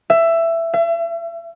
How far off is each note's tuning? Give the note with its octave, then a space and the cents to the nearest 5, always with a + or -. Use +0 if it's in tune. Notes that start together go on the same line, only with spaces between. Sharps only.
E5 +15
E5 +35